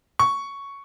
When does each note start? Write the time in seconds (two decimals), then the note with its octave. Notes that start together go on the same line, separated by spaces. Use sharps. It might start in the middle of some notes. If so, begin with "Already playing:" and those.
0.19 C#6